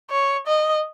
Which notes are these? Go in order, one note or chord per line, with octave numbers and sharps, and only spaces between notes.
C#5
D#5